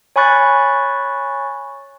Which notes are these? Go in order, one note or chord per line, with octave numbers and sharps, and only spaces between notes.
C#5 G#5 B5 C#6 F#6 A6